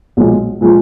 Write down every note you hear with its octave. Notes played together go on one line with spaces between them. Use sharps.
B1 A#2 F3 G#3
A#2 F3 G#3